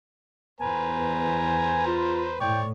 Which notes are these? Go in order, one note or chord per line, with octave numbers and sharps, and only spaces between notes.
E2 B4 C5 G#5 A#5
F4
A2 C#5 D5 G5